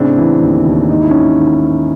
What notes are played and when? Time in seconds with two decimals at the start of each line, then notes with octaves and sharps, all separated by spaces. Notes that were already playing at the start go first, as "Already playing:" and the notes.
Already playing: A2 C#3 C4 D4
0.18 E3
0.41 D#2
0.66 D#2
0.90 G#2 D#4
1.00 E4
1.10 D#3 C#4 D#4
1.39 D#3